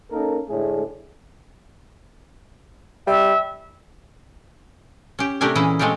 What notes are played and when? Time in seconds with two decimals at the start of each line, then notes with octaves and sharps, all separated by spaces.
0.11 A#3 C#4 D#4 A4 A#4
0.49 A2 D3 G#3 A3 D4 G#4
3.07 G3 E5
5.19 C#4 G4
5.41 C3 A3 D4 G4 A#4 G#5
5.55 A#2 E3 C#4 E4 G#4
5.79 G#3 A3 C4 F4 G4